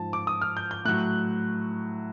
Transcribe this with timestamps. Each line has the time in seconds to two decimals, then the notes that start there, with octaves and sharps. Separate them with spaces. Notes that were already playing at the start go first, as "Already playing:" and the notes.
Already playing: G#2 F3 A5
0.13 D6
0.27 D#6
0.41 F6
0.57 G6
0.71 G6
0.85 A2 F#6
0.88 F#3